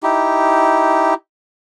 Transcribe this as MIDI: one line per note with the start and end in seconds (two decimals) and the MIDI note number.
0.03 1.14 63
0.03 1.14 64
0.03 1.14 67